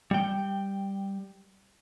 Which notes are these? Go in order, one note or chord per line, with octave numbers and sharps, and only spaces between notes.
G3 G5